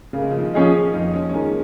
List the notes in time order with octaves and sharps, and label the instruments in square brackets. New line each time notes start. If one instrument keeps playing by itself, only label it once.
[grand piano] C#3 [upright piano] A#3
[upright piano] G#3
F3
D#3 G#3
[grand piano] F3 C#4 G#4 D#5
[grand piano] F2 [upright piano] A#3 D#4
[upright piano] G#3 C#4
C#4
[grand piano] D#3 G#3 [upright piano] F3 A#3